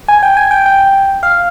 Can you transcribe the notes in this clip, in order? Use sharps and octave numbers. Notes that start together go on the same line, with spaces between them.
G#5
G5
G#5
G5
G5
F5